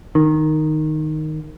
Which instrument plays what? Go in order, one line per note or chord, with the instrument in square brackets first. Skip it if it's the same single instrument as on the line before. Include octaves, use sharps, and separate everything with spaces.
[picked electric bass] D#3